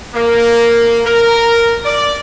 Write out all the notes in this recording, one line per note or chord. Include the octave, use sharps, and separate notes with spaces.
A#3
A#4
D5